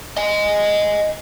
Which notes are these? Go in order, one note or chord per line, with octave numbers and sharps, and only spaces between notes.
D#5 G#5